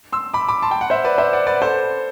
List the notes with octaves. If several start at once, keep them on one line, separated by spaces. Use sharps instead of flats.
C6 E6
B5 D6
B5 D6
A5 C6
G5
F#5
C5 E5
B4 D5
C5 E5
D5 F#5
B4 D5
A4 C5